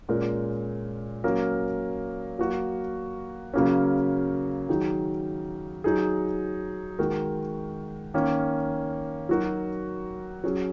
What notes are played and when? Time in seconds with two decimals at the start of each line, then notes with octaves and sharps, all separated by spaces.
0.09 A#2 G#3 C#4 A#4
1.24 F#3 A#3 C#4 A#4
2.39 F#3 A#3 F#4 A#4
3.54 C#3 F#3 A#3 C#4
4.69 D#3 F#3 D#4 G#4
5.84 F#3 D#4 G#4
6.99 D#3 G#3 F#4 A#4
8.14 D#3 A#3 C#4
9.29 F#3 D#4 F#4 A#4
10.44 F#3 C#4 G#4